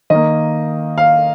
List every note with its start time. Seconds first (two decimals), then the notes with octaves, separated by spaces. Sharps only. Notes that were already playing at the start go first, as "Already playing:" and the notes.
0.10 D#3 A#3 D#5
0.98 F5